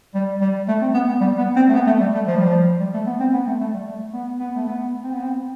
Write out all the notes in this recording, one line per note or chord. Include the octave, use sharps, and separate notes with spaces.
G3
G3
A3
C4
B3
B3
G3
B3
C4
A3
B3
A3
G3
A3
F3
G3
F3
G3
A3
B3
C4
B3
A3
A3
G3
A3
B3
B3
A3
B3
C4
B3
C4